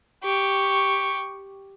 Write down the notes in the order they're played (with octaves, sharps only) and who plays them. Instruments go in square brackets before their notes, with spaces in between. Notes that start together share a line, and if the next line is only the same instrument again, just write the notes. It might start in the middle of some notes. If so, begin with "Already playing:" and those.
[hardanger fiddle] G4 C#6